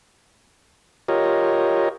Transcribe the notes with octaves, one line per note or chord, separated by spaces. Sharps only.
F4 G4 A#4 C#5 D#5